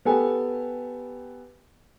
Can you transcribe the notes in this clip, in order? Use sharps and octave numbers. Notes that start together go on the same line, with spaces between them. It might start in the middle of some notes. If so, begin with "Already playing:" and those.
B3 G4 A4 G#5